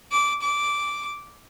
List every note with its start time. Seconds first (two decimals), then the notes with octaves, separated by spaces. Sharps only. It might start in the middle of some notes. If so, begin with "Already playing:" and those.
0.12 D6
0.42 D6